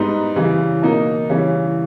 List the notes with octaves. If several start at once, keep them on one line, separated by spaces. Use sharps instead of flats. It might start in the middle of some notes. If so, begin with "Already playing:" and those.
Already playing: G#2 G3 B3 D#4
C#3 E3 G3
B2 A#3 D#4
C#3 E3 G3 C#4